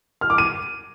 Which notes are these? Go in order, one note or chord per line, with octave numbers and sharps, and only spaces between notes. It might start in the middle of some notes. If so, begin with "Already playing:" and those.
F6
D6
D#7